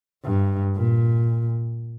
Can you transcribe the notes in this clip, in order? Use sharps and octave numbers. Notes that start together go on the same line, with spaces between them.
G2
A#2